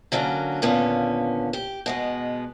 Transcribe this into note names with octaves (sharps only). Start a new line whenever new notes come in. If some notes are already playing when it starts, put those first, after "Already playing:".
D3 F#3 A#3 C#4
D#2 A#2 D3 B3 C#4
G4
B2 G#3 B3